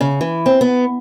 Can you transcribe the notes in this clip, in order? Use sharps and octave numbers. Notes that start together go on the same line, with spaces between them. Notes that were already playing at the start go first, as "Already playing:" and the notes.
C#3
E3
C4
B3